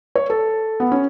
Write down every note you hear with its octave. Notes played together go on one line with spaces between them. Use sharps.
C#5
A4
B3
C#4